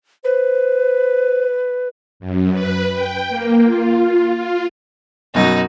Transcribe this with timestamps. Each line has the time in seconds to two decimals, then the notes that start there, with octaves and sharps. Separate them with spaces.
0.24 B4 C5
2.20 F#2
2.52 B4
2.92 G5
3.29 A#3
3.64 F4
4.04 F4
4.34 F4
5.35 F#2 B2 D#4 F#4